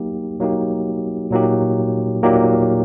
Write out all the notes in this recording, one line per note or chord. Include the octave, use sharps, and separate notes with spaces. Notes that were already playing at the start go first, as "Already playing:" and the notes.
Already playing: F#3 A#3 D#4 G4
F#3 A#3 D#4 G4
A#2 F#3 A#3 D#4 G4
A#2 F#3 A#3 D#4 G4